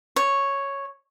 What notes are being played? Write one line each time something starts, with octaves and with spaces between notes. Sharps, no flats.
C#5